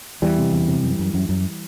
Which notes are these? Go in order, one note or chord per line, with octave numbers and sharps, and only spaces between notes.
E2 E3 G3
C3
E2
C3
F#2
F#2
F#2
F#2